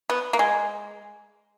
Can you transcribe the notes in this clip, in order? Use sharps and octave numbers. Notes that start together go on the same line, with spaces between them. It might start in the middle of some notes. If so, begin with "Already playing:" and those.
B3
A#3
G#3